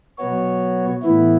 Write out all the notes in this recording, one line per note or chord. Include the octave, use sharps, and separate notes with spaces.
B2 F#3 B3 F#4 C#5
A2 E3 B3 E4